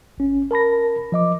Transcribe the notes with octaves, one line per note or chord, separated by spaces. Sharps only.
G1 C#4
A#4 A5 B5 A#6
F3 D#5 D6